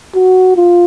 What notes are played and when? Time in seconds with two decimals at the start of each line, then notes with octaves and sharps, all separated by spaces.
0.15 F#4
0.56 F4